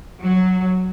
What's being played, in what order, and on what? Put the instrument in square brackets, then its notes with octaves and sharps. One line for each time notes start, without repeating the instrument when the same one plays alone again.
[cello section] F#3